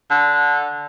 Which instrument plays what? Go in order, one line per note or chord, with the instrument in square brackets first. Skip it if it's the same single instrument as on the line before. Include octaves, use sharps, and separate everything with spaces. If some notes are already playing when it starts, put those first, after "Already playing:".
[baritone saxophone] D3